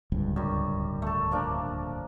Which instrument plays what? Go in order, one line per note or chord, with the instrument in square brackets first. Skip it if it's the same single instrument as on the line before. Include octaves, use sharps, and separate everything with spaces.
[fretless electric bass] D1 C#2 G2
[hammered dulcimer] F#2 G3
A3 A4
F3 A#3 D4